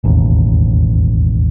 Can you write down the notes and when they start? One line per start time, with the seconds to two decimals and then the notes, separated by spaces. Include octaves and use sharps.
0.04 E1 A1 D#2